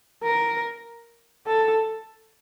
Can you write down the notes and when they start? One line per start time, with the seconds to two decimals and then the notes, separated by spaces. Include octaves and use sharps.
0.23 A#4
1.47 A4